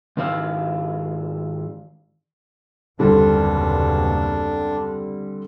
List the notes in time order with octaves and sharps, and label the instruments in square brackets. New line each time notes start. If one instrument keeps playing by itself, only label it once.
[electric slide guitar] G#2 D#3 E4 F5
[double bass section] F#1 D#2 B2 [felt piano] D3 G3 C4 [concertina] D4